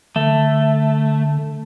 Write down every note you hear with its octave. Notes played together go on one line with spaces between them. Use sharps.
D3 A3